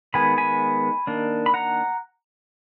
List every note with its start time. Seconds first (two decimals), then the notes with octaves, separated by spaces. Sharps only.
0.14 D#3 G#3 B3 G#5 B5
0.38 G#5 B5
1.07 D#3 A#3 D4
1.46 B5
1.54 F#5 A#5